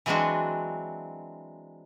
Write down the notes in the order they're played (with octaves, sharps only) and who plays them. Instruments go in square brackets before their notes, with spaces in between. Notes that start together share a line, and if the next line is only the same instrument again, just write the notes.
[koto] E3 F#3 G#3 C4 D4 F#4